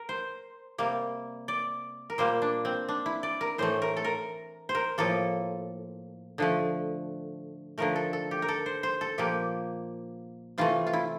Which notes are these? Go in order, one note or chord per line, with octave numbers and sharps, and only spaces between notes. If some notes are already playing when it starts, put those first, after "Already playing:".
Already playing: A#4
C5
C3 G3 A#3
D5
A#4
A#2 G3 A#3 C5
D4
C4
D4
E4
D5
A#4
A2 E3 A3 C5
A#4
A4
A#4
C5
A#4
A2 F3 A#3 A4
D3 F3 A3
D3 F3 A3 A#4
A4
A4
G4
A#4
A4
C5
C5
A4
A#2 F3 A#3 G4
C3 E3 A3 F4
F4
E4